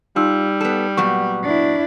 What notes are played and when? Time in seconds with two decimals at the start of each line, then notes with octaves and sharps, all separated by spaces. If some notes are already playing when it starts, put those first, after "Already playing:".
0.16 G3 D#4 F4 E6
0.61 B3 A4
0.97 A#2 F#3 B3 C#6
1.43 D4 E4